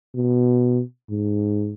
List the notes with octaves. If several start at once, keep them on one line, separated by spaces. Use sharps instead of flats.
B2
G#2